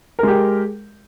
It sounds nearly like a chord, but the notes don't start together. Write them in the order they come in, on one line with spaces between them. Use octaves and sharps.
A#4 G#3 G4